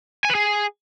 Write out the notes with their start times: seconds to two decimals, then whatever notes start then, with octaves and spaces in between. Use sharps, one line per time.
0.25 G#5
0.30 B4
0.35 G#4